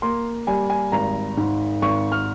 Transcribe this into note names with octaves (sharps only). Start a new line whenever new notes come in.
A#3 C6
G3 G#5
G#5
G#1 A#5
G#2
G#1 C#6
F6